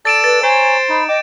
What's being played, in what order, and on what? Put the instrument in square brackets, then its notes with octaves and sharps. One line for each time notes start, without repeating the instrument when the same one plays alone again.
[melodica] A4 D5 A5 [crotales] A6 D7 E7
[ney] B4 [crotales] A6
[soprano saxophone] C5 [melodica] C#5 A#5 [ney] G#5
[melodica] D#4 [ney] B5
[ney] D#5 [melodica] G5 D6